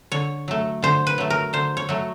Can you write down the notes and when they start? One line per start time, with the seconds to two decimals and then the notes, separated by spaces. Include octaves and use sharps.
0.12 D3 C#5
0.48 F#3 A3
0.83 D3 C5
1.07 B4
1.18 F#3 A3
1.30 A#4
1.53 D3 C5
1.77 C#5
1.89 F#3 A3